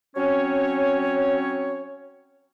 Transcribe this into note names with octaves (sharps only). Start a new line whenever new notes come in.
F#3 C4 C#4 C#5